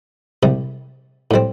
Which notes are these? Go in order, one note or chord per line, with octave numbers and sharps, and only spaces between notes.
C2 C3 G3
A2 G3 C4